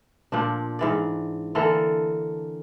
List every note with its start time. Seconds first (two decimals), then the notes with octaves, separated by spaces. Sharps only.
0.32 A#2 F3 D4
0.79 G#2 E3 D5
1.55 D3 E3 A#3 A4